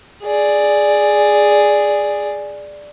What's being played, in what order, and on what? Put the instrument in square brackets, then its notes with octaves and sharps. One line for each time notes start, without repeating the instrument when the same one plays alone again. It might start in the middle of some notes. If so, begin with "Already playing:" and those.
[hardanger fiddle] G#4 D5